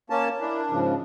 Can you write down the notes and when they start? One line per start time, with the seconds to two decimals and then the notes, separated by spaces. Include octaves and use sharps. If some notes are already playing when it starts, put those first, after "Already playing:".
0.10 A#3 C#4 A5
0.40 D4 E4 A#4
0.70 G#2 C#3 F3